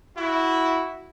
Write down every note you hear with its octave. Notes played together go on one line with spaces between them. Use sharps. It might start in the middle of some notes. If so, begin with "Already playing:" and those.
E4 F#4